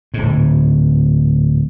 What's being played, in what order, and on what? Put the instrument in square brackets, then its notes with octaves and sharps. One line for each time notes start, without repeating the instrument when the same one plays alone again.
[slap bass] D1 G#2